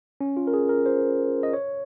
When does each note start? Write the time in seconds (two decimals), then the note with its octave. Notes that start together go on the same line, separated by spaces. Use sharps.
0.21 C#4
0.37 F4
0.47 A#4
0.54 G#4
0.69 A#4
0.86 C5
1.43 D#5
1.53 C#5